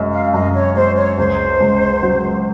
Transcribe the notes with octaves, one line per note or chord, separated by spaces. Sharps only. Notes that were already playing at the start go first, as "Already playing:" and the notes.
Already playing: F#2 G#3
F5
F#2 D#5
C#5
G#3 C5
C#5
C#2 C5
C#2
F#3